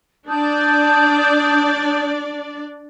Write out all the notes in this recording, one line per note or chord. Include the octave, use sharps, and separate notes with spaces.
D4 D5 A5 D#6 G6